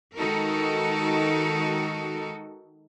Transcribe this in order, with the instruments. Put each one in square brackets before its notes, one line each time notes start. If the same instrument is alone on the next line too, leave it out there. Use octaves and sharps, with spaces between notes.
[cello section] D#3 G#3 D#4 F#4 A4 A#4